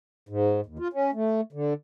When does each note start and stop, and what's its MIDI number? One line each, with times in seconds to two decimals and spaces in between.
0.29 0.61 44
0.66 0.78 39
0.79 0.88 65
0.93 1.11 61
1.14 1.41 57
1.53 1.74 50